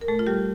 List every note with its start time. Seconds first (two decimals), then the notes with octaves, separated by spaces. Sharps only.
0.01 A#4
0.08 A#2 A3 A4
0.19 F4
0.27 G3 G4